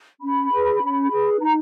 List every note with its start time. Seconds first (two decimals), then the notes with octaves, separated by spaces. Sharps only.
0.21 C#4 B5
0.52 G#4 B4
0.81 C#4
1.11 G#4 B4
1.40 D#4 A#5